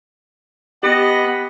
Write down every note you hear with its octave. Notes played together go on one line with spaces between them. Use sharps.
B3 G4 D#5 F#5 B5